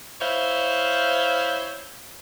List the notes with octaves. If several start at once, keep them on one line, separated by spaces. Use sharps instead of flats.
E4 C5 C#5 E5 F5